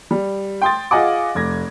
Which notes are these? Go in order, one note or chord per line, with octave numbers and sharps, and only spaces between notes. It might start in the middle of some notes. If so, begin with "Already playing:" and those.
G3
G5 C6 D#6 A6
F4 G#4 D#5 F#5 G#5 D6
F1 G#6 A#6